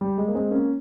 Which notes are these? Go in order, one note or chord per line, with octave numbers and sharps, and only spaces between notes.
G3
G#3
A#3
G#3 C4
A#3 C#4